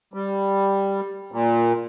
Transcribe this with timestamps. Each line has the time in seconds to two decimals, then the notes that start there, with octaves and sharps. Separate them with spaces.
0.14 G3
1.32 A#2